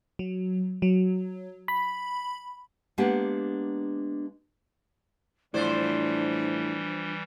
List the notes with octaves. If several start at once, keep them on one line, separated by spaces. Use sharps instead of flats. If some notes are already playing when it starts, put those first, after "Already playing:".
F#3
F#3
B5
G#3 A#3 B3 D4 G4 F#5
A2 E3 F3 G3 D4 C5 D5